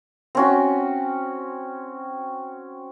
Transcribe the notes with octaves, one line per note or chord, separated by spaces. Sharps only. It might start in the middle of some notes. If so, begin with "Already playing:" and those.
C4 C#4 F#4